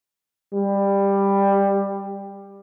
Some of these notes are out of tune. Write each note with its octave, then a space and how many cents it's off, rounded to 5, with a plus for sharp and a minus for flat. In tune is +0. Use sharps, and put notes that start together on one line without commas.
G3 +15